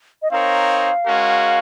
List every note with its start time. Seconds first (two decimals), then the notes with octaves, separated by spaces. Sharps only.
0.22 D#5
0.31 C4 D#4 A#4 C#5 F5
1.06 G#3 C#4 F#4 A#4